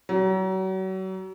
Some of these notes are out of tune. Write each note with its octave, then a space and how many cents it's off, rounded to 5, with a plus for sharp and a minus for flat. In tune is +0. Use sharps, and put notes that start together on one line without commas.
F#3 +35